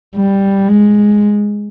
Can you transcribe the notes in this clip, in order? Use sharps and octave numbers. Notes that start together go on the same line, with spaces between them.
G3
G#3